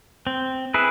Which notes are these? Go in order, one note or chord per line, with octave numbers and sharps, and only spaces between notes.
C4
E4 G#4 B4 E5